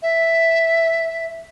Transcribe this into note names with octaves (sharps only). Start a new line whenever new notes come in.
E5